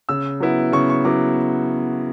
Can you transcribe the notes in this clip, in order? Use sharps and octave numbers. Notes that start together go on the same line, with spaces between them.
C#3 E6
F#3 B3 E4
C#3 C#6
C#6
F#3 B3 E4 D6